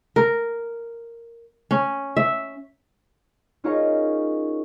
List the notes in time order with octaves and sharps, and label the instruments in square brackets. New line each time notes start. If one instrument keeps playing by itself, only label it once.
[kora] A#4
C#4
E5
[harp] C#4 D#4 F4 G#4 A#4 C#5